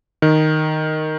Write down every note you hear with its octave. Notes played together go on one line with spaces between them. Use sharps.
D#3